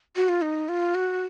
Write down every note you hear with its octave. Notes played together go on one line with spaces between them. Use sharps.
F#4
F4
D#4
F4
F#4